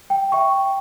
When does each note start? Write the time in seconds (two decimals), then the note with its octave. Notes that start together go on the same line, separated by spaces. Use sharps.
0.10 G5
0.32 E5 G5 C#6